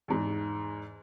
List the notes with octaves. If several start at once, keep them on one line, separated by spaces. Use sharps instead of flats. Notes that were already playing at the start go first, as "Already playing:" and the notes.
E2 G#2